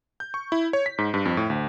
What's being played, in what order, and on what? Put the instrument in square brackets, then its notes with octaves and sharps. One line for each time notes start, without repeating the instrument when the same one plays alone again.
[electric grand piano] G6
C#6
E4
C#5
B6
G#2
G2
F2
A2
D2